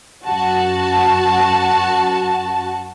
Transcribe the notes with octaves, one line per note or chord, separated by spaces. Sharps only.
F#2 F#4 A5